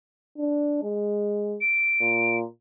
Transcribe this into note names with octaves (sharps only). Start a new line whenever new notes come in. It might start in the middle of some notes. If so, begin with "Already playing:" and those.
D4
G#3
D7
A#2